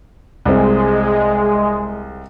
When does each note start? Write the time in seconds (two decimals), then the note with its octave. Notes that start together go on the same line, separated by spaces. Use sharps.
0.45 C2 G#3 C4